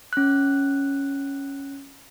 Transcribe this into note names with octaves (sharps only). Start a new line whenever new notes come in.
C#4 F#6